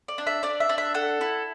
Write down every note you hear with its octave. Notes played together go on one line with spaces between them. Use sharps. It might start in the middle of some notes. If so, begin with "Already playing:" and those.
D5
D4
E5
D4 D5
E5
D4
E5
A4 F#5
E4